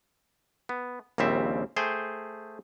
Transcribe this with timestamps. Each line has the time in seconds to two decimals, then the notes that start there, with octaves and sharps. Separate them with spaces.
0.69 B3
1.18 A#1 D#2 C#3 G3 C4 E5
1.76 A3 G#4 C5 G5